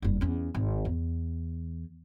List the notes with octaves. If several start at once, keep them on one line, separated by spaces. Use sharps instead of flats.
F#1 G2
E2 C#4
G#1
E2